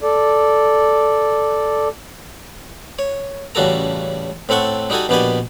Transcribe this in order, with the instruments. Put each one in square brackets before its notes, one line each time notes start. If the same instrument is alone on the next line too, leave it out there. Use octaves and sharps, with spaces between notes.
[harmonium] A4 D5
[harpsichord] C#5
A1 C#3 G3 F#4 A4 A#5
A2 C4 A4 F#5 C#6
G3 D#4 F#4 A4 G#5
A#1 B2 B3 G4 D5 G#5